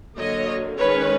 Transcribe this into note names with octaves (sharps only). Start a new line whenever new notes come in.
D3 F#3 A#3 C#5 D#5
D#3 G#3 C#4 B4 C#5